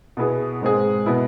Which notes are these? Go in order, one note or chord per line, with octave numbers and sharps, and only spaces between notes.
B2 B3 E4 G#4
G#2 G#3 C4 G#4
B2 B3 E4